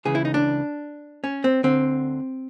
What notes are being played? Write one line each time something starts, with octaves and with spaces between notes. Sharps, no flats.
C#2 C#3 E3 G#4
E4
D#4
D4
C#4
C4
D2 D3 C4